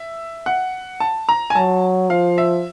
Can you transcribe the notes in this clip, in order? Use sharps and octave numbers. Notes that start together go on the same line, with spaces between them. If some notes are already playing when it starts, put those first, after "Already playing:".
Already playing: E5
F#5
A5
A#5
G#5
F#3 A5
F3 F5
E5